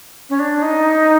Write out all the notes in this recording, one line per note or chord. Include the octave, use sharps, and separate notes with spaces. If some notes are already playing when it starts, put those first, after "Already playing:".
C#4
D4
D#4